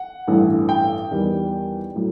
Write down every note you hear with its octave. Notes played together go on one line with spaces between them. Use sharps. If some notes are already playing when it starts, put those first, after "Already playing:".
Already playing: F#5
A1 G2 E3 A3
G5
E2 D#3 G3
A2 F#3